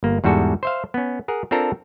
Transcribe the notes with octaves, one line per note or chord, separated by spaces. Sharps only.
G1 A#3
E2 G#2 G3 F#4 A4
C5 E5 F5
B3 C#4
G#4 A#4 F#5
C4 D4 F4 A4 A#4 A#5